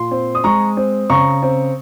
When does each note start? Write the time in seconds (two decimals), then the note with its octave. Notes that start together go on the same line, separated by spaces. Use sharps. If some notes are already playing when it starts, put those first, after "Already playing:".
Already playing: A#2 C6
0.11 C4
0.35 D#6
0.44 G#3 A#5 C#6
0.77 C4
1.10 C#3 A#5 C#6
1.42 C4